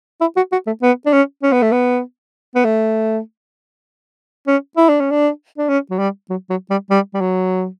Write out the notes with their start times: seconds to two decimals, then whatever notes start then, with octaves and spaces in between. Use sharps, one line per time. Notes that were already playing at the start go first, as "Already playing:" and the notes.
0.21 E4
0.37 F#4
0.52 F#4
0.67 A3
0.82 B3
1.06 D4
1.13 C#4
1.43 C#4
1.53 B3
1.62 A3
1.72 B3
2.55 B3
2.65 A3
4.47 C#4
4.77 E4
4.89 D4
5.00 C#4
5.11 D4
5.58 D4
5.69 C#4
5.91 F#3
5.99 G3
6.30 F#3
6.50 F#3
6.70 G3
6.90 G3
7.14 G3
7.21 F#3